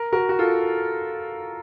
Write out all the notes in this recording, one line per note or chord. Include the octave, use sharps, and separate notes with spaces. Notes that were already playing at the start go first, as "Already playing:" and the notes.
Already playing: A#4
F#4 A#4
F#4
F4 A4